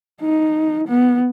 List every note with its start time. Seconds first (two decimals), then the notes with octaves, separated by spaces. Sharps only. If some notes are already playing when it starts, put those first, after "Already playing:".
0.21 D#4
0.88 B3